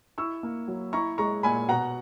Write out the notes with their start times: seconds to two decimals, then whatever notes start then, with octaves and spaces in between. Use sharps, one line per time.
0.18 E4 C#6 E6
0.43 A#3
0.68 F#3
0.93 E4 A#5 C#6
1.18 G#3 A#5 C#6
1.43 A#2 G#5 B5
1.68 B2 F#5 A#5